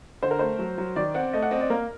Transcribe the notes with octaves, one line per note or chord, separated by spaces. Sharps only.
D3 C5
A#4
A3 C5
F#3
F#3
D#3 D5
C4 F#5
A3 D#5
F#5
C4 D#5
D5
A#3 A#4